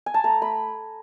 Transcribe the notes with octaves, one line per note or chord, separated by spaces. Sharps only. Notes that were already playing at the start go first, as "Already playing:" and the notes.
G#5
A5
A3 A#5
A3 B5